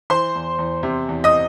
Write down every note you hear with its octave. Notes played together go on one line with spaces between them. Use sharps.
E3 C5 C6
E2
E2
C3
E2
D#5 D#6